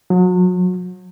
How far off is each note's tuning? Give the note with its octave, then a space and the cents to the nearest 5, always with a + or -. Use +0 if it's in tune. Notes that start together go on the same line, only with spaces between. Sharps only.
F#3 -35